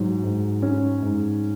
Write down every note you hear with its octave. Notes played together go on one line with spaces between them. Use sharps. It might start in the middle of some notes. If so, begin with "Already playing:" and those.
Already playing: G#2 F#3
G#2
C#4
G#2